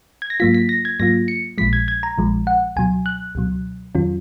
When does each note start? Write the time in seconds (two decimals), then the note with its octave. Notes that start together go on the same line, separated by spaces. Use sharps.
0.22 G#6
0.30 A#6
0.40 G#2 F#3 A#3 F4 B6
0.54 B6
0.69 A#6
0.85 G#6
1.00 G#2 F#3 A#3 F4 A#6
1.28 C#7
1.58 A#1 A#2 F3 G#3 B6
1.73 G#6
1.88 G#6
2.03 A#5
2.18 A#1 A#2 F3 G#3
2.47 F#5
2.76 C#2 B2 F#3 G#5
3.06 F#6
3.35 C#2 B2 F#3
3.95 F2 D#3 F#3 C#4 F4